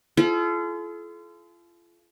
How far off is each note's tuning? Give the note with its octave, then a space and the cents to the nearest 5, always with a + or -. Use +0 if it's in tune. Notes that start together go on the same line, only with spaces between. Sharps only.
F4 -35 A4 -45